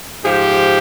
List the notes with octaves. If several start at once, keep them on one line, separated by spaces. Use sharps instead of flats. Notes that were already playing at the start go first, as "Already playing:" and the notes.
G#2 F3 G4